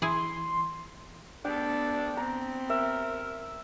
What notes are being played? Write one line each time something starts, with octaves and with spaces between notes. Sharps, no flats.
E3 E4 G#4 C6
B3 D4 A4 G5
B3 C4 A#5
A#4 E5